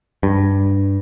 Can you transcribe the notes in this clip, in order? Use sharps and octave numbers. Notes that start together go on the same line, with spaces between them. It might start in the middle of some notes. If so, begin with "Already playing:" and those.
G2